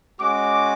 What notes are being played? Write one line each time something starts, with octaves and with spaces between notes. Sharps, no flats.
G#3 C#4 F#4 D6